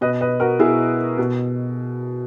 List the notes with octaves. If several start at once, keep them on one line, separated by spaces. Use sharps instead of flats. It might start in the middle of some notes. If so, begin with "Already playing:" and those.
B2 B4 D#5
B4 D#5
F#4 A#4
B2 E4 G#4
B2